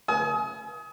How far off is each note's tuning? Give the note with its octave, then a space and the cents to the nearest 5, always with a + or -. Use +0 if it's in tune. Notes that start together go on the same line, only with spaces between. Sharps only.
G#5 +40 D#6 +25